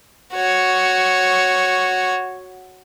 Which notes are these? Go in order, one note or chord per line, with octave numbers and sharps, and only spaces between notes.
F#4 C#5